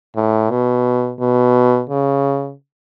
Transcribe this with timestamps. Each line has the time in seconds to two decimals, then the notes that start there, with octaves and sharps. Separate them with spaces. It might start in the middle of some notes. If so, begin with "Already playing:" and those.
0.16 A2
0.50 B2
1.20 B2
1.90 C#3